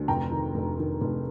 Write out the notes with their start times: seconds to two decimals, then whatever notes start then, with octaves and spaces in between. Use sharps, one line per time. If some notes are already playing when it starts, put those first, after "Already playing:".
Already playing: D2
0.08 F1 G5 A#5
0.31 D#3
0.55 F1
0.79 D#3
1.01 F1